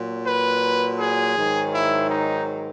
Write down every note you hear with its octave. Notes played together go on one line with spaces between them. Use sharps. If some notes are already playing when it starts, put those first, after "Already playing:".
Already playing: A#2 F#3
B4
G#4
G#2 D#3 F#3
E4
D#4